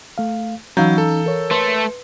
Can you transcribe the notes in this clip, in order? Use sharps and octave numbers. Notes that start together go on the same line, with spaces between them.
A3 F5
E3 F#3 C#4 D#4 F5 A#5 G6
A4
A#4 C#5
A3 B4 C6